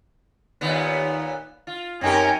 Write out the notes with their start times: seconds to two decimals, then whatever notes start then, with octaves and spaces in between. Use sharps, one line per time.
0.61 D#2 A#2 B3
1.67 F4
2.01 F#2 C4 C#4 D#4 G4 A#4 G5 G#5